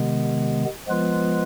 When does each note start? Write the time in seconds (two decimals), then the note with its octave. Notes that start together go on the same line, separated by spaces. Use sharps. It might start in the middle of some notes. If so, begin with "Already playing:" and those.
Already playing: C3 D#3 G#3 B3
0.87 F3 G#3 B3 F4 B4